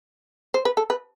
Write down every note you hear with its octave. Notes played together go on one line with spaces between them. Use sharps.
C5
B4
A4
B4